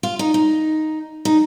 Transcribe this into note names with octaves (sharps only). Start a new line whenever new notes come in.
F4
D#4
D#4
D#4